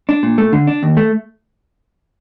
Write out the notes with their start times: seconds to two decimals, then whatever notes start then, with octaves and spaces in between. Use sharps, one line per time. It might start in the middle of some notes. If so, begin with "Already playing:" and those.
0.09 D4
0.23 A#2
0.38 A3
0.53 D3
0.67 D4
0.83 D#2
0.97 A3